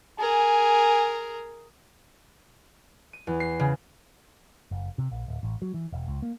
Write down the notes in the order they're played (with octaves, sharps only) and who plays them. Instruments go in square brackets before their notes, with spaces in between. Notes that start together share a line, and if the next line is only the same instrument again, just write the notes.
[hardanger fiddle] G#4 A#4 [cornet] G#5
[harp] D#7
E2
C7
C#3
[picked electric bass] F#1
C3
A#1
D1
A1
F#3
E3
E1
C#2
A#3